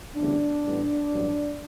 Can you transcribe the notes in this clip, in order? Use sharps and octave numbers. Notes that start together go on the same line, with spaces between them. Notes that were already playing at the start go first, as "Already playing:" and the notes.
D2 C#3 E3 G3 B3 D4
A1 A2 G3 B3
A1 G2 F#3